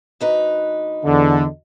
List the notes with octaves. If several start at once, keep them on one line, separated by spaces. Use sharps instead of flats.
D2 D#4 B4
E2 D3